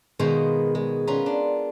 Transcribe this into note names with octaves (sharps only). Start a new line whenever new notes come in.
B2 D#3 G#3 B3 C5 F5
G#3
B3 C#4 F4 A#4
D4